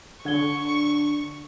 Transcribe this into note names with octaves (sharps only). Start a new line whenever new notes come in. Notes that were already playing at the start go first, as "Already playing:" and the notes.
D3 D4 C#6 G#6 G7